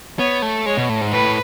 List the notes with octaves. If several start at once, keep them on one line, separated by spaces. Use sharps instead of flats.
B3 C#5
A3
G#3 C#5
B2
A2
G#2
A2 B4